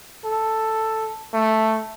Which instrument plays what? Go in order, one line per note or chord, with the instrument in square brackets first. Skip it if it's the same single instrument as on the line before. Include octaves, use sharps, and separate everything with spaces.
[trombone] A4
A3